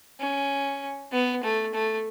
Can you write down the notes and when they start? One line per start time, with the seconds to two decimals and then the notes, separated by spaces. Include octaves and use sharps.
0.20 C#4
1.12 B3
1.43 A3
1.74 A3